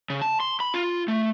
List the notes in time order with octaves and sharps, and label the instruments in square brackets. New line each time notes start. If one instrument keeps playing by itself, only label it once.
[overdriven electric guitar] C#3
A5
C6
B5
F4
A3